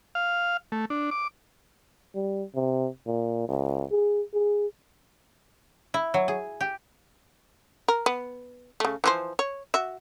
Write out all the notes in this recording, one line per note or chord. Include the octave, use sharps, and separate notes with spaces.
F5
A3
D4
D6
G3
C3
A#2
C#2
G#4
G#4
E4
F#3
G#4
G4
A#4
B3
C#3 A3
E3 F3 C5
C#5
F#4 E5